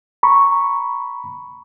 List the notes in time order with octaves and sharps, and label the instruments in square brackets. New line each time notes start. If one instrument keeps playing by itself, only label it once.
[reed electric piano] A#5 B5 C#6